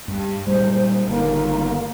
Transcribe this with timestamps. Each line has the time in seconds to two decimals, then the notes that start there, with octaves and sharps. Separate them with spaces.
0.08 G2
0.47 A#2 G3 G#3 C5
1.08 G1 D#3 A#3